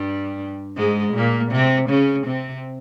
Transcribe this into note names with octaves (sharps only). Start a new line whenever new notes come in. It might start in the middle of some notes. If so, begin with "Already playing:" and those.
Already playing: G2 G3
G#2 G#3
A#2 A#3
C3 C4
C#3 C#4
C3 C4